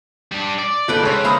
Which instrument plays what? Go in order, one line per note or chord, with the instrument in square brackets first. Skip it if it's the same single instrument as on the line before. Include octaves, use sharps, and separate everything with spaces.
[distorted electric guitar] G3 D4
D5
[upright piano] G#1 [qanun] A4 B4 G5
[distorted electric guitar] C#3 [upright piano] G#3 C#5
[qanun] C5 F5 A#5 [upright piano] B5 D#6